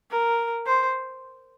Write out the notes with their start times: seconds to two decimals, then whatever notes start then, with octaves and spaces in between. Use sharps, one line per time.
0.11 A#4
0.66 C5